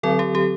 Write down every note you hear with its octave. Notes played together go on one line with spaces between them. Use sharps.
D3 F#3 C4 A4
G4
G4